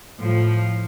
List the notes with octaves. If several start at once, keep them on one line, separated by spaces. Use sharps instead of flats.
A2 F3